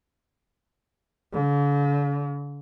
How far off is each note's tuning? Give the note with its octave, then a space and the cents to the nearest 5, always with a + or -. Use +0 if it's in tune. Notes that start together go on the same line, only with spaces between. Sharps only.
D3 -45